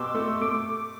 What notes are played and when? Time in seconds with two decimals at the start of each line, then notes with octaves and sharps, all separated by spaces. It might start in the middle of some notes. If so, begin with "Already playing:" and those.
Already playing: B2 G4 C6 D6 E6
0.14 A3
0.41 A3 D6